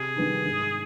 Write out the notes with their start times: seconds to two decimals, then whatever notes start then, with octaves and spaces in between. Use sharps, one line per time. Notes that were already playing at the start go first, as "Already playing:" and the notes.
Already playing: C3 G#4
0.16 D#3 G3 B3 D#4
0.45 G#2